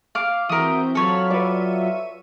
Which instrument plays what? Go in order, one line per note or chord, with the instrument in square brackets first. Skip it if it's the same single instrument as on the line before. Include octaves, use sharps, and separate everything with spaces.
[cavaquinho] F5 D6
[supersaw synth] E3 C4 G6 [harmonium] F#4 E5 [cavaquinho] A#4 D#6
[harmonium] F#3 F4 [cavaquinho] A4 C#5 [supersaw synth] A5 B5 F6
[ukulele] B4 D5 [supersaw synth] E5 C#6 D#7